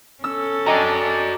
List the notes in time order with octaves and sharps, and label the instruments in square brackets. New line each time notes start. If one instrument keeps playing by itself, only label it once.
[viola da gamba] C#4 A4 [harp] E6
[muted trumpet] D4 [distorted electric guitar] F#4 G#5 [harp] D#5 G5 A#5
[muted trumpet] D5